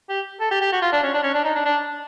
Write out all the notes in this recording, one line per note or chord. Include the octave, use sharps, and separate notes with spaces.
G4
A4
G4
G4
F#4
F4
D4
C#4
D4
C#4
D4
D#4
D4
D4